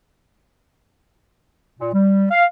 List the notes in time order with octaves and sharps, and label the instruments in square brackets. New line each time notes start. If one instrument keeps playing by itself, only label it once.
[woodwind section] A#2
G3
F5